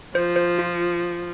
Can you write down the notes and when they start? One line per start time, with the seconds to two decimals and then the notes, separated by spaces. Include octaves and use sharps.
0.15 F3 C5
0.36 C5
0.59 F4